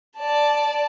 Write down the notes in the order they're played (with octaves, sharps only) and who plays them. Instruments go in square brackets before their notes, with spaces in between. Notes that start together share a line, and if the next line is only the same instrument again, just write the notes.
[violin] D5 A5